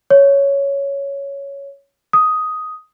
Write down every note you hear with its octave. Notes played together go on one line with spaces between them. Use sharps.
C#5
D#6